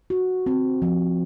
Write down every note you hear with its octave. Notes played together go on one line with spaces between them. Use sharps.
F#4
C4
F3